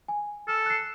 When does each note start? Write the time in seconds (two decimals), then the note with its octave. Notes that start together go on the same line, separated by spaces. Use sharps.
0.08 G#5
0.48 A4 F6
0.66 F#6 C7